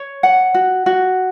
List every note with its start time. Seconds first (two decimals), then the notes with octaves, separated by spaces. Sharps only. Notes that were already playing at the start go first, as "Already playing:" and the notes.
Already playing: C#5
0.23 F#5
0.54 F#4
0.86 F#4